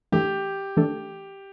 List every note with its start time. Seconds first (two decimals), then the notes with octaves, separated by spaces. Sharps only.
0.12 E3 A3 D4 G4 A4
0.77 E3 A3 D4 A4